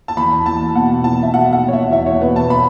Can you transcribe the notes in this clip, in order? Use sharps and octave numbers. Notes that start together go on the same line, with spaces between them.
A5
E2 B5
E2 A5
B2 F#5
E2 A5
E5
B2 F#5
F#5
E1
C#5
E5
E2 E5
C#5
B2 B4
A5
B5